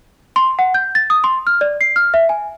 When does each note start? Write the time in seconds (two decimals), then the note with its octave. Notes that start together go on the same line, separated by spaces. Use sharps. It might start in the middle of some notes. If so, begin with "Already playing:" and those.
0.36 C6
0.59 F#5
0.74 G6
0.95 A6
1.10 D#6
1.24 C6
1.47 F6
1.61 D5
1.81 C7
1.96 F6
2.14 E5
2.29 G#5